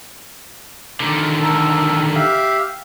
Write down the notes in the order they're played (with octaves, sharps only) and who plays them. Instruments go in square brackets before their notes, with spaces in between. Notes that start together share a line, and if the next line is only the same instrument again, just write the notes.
[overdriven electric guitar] D3 D#3
[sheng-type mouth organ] A4 A#4
G4 E5 F5